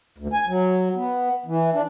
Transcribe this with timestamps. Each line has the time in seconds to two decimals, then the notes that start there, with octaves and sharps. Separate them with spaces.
0.18 D2
0.33 G#5
0.47 F#3
0.96 B3
1.46 E3
1.74 D4